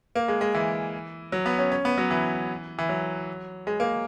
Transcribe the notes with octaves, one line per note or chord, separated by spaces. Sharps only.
A#3
G#3
G#3
E3
F#3
B3
C#4
C#4
B3
F#3
E3
E3
F#3
G#3
A#3